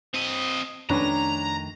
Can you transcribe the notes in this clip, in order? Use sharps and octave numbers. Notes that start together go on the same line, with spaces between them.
C4 D#5
F2 D#3 A3 C#4 D4 B4 A#5